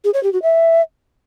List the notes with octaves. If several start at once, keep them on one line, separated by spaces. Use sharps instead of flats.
G#4
C#5
G4
F#4
E5